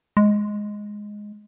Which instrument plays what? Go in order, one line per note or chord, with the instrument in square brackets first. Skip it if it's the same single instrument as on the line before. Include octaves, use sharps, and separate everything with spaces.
[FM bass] G#3